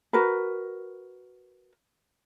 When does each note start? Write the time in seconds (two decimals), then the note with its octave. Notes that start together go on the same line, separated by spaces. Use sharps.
0.13 F#4 A#4 B4